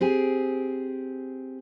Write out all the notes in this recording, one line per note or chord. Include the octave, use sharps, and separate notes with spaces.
C4 G4 G#4